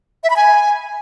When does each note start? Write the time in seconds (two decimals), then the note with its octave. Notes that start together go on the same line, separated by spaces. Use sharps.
0.24 E5
0.30 B5
0.36 G#5